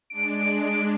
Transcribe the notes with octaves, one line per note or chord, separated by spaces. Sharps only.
G#3 D4 D7